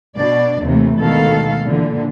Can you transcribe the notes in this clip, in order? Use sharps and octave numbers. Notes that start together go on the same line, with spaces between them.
B2 D4 D5
D#2 C3 E3 A3
D2 B2 D#3 G#3 A4 F5
A#2 D3 E3